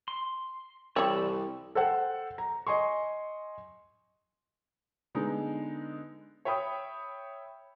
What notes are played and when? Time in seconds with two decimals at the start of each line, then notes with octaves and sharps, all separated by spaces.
0.08 C6
0.96 C2 E3 G3 C#5 D5 G5 E6
1.75 A4 C5 F#5 G5
2.38 A#5
2.67 D#5 G#5 C6 C#6
5.15 D3 G#3 B3 D#4
6.45 C#5 E5 G5 B5 D#6